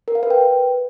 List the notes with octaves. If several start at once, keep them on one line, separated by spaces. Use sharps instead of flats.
A#4
F5
B4
G5
B4